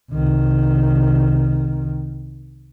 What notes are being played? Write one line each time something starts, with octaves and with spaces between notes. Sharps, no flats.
C2 D#3